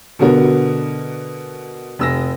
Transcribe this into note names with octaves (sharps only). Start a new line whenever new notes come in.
B2 D3 B3 F#4 A#4
F1 E6 A#6